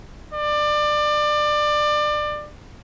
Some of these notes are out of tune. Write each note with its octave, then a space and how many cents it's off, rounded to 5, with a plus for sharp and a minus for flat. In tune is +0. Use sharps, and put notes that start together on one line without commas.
D5 +25